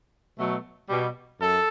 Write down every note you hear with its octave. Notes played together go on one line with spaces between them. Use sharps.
B2 F#3 A3
B2 G3
F#2 A4